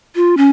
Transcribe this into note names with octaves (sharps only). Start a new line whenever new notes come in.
F4
C#4